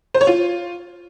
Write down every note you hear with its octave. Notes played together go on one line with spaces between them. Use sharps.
C5
C#5
F4